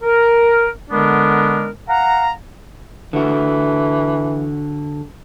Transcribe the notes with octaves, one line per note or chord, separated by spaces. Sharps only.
A#4
D3 G#3 B3 D4 A#4
F5 F#5 A#5
D3 E3 F#4